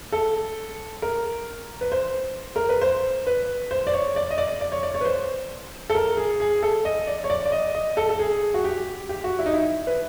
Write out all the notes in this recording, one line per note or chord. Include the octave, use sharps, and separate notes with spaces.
A4
A#4
B4
C5
A#4
B4
C5
B4
C5
D5
C#5
D5
D#5
D5
D5
C#5
D5
C#5
B4
C5
A4
A#4
G#4
G#4
A4
D#5
D5
C#5
D5
D5
D#5
D#5
A4
A4
G#4
F#4
G4
G4
F#4
E4
D#4
E4
B4